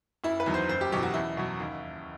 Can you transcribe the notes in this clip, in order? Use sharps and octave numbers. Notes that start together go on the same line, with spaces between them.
F#1 E4
B4
E2 D#3 F#3
C5
F#1 C5
G4
E2 B2 F#3 G4
F#4
E2 E4
B2 F#3
D#2